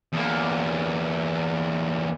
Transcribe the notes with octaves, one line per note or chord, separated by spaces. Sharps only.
E2 A#3